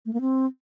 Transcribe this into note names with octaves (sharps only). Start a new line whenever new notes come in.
A3
A#3
C4